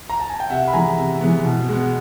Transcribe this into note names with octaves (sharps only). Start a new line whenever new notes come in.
A#5
A5
G#5
G5
C3 E5 F#5
B5
E3 G#3 B3 G#5 A#5
C3
E3 G#3 B3
B2
G#3 B3